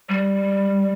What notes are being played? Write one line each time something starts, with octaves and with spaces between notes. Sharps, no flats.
G3